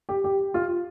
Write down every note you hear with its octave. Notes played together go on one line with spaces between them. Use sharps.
G4
G4
F4